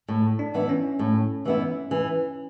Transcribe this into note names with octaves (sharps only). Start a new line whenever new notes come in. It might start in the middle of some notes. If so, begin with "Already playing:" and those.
A2
D4
E3 B3 E4
C#4
A2
E3 B3 E4
E3